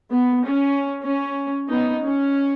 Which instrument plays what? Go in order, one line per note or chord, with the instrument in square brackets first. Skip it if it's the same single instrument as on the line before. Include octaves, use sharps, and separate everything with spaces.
[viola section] B3
C#4
C#4
B3 D#4
C#4